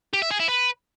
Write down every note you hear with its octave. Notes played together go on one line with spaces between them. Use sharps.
G4
E5
G#4
E4
B4